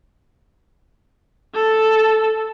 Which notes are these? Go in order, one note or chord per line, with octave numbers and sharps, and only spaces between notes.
A4